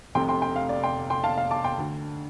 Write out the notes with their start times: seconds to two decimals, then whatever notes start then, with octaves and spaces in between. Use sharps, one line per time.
0.15 F1 F2 C3 G5 C6
0.28 G5 C6
0.42 G5 C6
0.56 F5
0.69 D5
0.83 G5 C6
1.10 G5 C6
1.24 F5 A5
1.38 F5
1.51 A5 D6
1.64 G5 C6
1.78 D2 D3